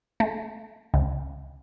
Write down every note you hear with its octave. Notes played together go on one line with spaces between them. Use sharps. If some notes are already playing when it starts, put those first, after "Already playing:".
A3
C#2